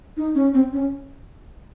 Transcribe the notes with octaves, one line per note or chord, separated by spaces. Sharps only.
D#4
C#4
C4
C#4